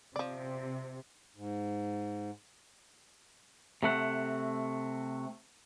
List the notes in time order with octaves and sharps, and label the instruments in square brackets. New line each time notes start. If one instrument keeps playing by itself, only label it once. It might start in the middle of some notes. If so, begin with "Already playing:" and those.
[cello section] C3 [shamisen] F3 D5
[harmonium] G#2
[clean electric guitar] C3 A3 F#5